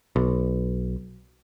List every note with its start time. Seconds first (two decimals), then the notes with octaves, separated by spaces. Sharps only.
0.16 B1